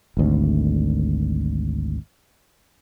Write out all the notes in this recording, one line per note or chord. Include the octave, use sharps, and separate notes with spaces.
G#1 D2